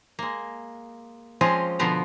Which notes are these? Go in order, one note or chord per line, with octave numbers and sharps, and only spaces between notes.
G#3 A#3
F3 G#3 C4 C#4 F4 D#5
B2 D3 F3 B3 F4 A#5